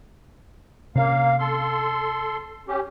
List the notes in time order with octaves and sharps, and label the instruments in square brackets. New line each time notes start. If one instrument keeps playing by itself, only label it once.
[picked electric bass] C3 C#4 [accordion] A#3 F5
[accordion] A4 C6
C#4 G4